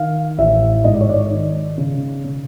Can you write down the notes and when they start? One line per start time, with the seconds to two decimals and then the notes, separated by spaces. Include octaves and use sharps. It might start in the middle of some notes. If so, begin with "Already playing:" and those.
Already playing: D#3 F5
0.38 A1 E5
0.84 G#2 D#5
0.94 D5
1.01 C#5
1.09 D5
1.31 D#3
1.78 C#3
2.24 C#3